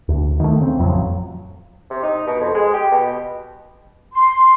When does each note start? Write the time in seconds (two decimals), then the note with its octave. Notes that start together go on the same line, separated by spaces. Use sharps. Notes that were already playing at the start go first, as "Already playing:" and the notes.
0.08 D2
0.40 D#3 A3
0.61 C#3 C4
0.78 A1 F2 F3 F#3
1.90 C3
2.03 D#4
2.27 B2
2.40 F2
2.54 G#3
2.74 G4
2.91 B2
4.15 C6